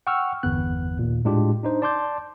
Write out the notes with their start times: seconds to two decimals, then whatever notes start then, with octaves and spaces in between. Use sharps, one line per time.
0.07 F#5 G5 C#6 E6 F6
0.43 G1 E2 B3 F#6
0.99 D#2 A#2
1.25 A2 G#3 D4 F4 G4
1.63 D4 D#4 C5
1.82 D5 A5 C6 D6 G6